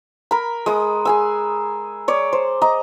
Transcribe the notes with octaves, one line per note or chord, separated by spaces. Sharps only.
A#4 B5
G#3 D#6
G#4 G#5 E6
C#5 D5
C5
D#5 A#5